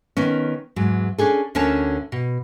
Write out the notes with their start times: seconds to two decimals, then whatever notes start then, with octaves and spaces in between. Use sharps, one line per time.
0.17 D#3 B3 C#4
0.76 E2 G#2 F#3
1.18 C#4 D4 G#4 A4
1.55 D2 D3 C#4 A#4 C#5 A5
2.12 B2